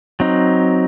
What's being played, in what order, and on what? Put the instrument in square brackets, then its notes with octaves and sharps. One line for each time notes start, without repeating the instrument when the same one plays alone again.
[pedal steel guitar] F#3 C4 D#4